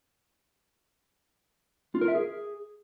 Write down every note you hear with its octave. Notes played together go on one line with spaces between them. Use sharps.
F4
A#4
E5
G#4